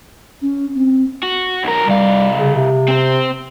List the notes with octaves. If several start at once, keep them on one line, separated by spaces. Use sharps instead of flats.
C#4
C4
F#4
B1 A#4
C2 G3 F5
C#3
C3
C4 C5